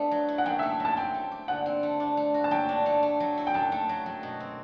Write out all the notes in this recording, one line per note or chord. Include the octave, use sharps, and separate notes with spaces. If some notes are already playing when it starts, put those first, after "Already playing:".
Already playing: A3 B3 D4
F#3
E4
F#5
F#2 G5
A3 E5
F#3 A5
C4 G5
A3
G4
D3 F#5
C4
A3
D4
A3
F#4
A5
F#3 G5
D4
A3
A3
F#3
E4
G5
F#2 A5
A3
F#3
F#3
B2
C4